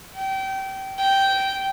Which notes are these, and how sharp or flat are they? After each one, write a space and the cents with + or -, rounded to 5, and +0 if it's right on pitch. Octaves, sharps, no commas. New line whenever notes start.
G5 -25
G5 -10